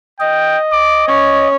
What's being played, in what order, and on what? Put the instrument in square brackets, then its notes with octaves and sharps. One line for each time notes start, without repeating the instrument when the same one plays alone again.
[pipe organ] D#5 [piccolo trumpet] G5
[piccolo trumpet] D6
[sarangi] C#4 [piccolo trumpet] C#5